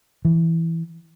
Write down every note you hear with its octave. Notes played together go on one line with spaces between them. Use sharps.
E3